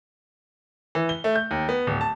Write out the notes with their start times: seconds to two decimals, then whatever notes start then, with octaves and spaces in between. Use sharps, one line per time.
0.95 E3
1.09 G7
1.24 A3
1.36 G6
1.51 D#2
1.69 B3
1.87 D1
2.01 A5